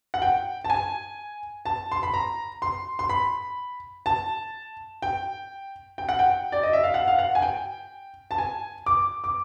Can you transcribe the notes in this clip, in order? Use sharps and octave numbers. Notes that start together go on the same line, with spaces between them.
F#5
G5
A5
G#5
A5
C6
B5
A#5
C6
C6
B5
A5
G5
G5
F#5
G5
D5
D#5
E5
F5
F#5
F5
F#5
G#5
G5
A5
G#5
D6
D6